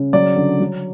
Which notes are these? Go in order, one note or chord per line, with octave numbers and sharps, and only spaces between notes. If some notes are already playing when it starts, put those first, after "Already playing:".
Already playing: C#3
F#3 D5
D3
F#3